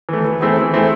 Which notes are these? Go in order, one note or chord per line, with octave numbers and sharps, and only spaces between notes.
E3 A3
E3
A3 C4 E4 G#4
E3
A3 C4 E4 G#4